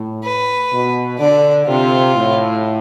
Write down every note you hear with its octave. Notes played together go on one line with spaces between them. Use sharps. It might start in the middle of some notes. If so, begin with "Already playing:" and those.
Already playing: A2
B4
B2
D3 D5
C3 F4
A2